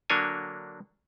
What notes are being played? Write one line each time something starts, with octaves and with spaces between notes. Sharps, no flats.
D3 F#3 A#3 D4 C#5 G#5